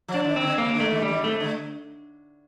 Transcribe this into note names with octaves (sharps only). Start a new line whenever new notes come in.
F3
D4
D#3
C4
D3
C3 A#3
D3
A3
D#3
G3
D#3
C3 A3
D3